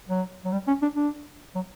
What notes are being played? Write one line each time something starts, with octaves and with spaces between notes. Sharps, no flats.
F#3
F#3
G3
C#4
D4
D4
F#3